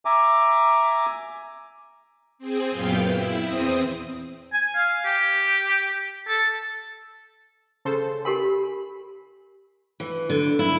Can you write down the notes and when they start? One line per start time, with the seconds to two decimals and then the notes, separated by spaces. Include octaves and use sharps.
0.05 E5 G#5 A#5 D6
2.38 C4 G#4
2.70 F#2 A#2 B3 F5 G5 G6
3.05 E4
3.43 E2 C4 D#6
4.53 G#5
4.75 F5
5.05 G4
6.28 A4
7.85 C#3 A4 C5
8.25 G4 A#4 G#5 B5
10.00 E3
10.30 D3
10.59 E4